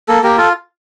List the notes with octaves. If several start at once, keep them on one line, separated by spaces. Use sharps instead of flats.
A#3 A4
A#3 G4 A#4
F4 A4